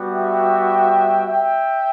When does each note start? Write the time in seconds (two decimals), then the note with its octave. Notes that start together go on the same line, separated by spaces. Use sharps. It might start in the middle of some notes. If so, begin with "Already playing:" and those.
Already playing: G3 B3 F#4
0.13 E5 G5
1.25 E5 G5